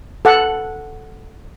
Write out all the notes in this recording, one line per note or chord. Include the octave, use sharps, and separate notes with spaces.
A4 F#5